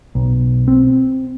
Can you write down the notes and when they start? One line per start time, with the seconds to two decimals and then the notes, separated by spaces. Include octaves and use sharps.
0.15 B1
0.68 C4